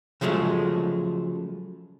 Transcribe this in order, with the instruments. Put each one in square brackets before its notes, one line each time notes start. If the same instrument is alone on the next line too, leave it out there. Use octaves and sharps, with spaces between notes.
[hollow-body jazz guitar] C#3 F3 F#3 G#3 A3